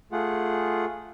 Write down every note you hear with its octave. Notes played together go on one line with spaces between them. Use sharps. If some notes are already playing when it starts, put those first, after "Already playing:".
A3 F4 G#4 F#5